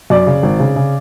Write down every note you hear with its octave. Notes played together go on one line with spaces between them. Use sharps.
F#2 D5
C#3
G#1
C#3
C#3